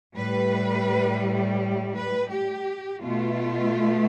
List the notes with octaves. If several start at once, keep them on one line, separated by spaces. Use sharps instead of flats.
A2 G3 B4
B4
G4
B2 A3 F4